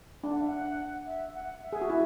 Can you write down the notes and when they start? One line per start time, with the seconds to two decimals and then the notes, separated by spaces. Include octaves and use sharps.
0.24 D4
0.32 F#5
0.41 E5
0.48 F#5
1.07 E5
1.35 F#5
1.62 E5
1.73 G#4
1.82 F#4
1.90 E4